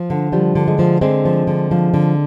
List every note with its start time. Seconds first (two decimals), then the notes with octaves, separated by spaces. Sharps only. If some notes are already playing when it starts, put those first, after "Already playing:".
Already playing: F3
0.10 D3
0.32 F3 G3
0.55 D3
0.68 G#3
0.79 F3
1.01 D3 G#3 C4
1.25 F3
1.47 D3
1.71 F3
1.94 D3